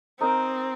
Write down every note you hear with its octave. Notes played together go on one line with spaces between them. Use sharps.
C4 D#4 A#4 D#5